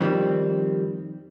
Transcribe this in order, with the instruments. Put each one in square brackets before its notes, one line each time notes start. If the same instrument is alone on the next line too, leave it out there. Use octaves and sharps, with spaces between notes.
[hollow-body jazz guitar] F2 D#3 G3 C4